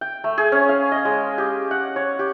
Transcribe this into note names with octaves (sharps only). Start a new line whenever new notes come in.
G5
A3
G#4
C#4
F5
D#5
G#3
G4
F#5
C#5
G4